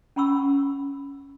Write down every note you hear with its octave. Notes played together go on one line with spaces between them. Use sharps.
C#4 F#5 B5 C#6 E6